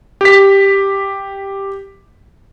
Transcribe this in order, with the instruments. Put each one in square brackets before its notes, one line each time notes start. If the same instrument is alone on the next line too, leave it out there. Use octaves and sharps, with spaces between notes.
[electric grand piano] G4 B6